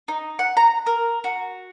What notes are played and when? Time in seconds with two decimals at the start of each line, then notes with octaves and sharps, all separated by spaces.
0.08 D#4
0.39 F#5
0.57 A#5
0.86 A#4
1.24 F#4